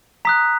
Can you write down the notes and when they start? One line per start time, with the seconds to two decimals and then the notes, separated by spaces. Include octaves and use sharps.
0.25 A#5 D#6 F#6 B6